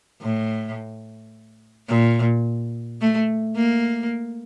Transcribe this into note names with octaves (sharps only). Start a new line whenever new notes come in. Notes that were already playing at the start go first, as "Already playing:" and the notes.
A2
A#2
A3
A#3